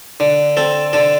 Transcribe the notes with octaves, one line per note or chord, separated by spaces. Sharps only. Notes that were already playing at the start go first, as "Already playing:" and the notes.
D3
C4 A4
D3 A4